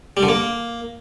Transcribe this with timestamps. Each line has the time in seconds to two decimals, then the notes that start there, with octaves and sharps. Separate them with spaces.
0.17 G3
0.23 D3
0.29 A#3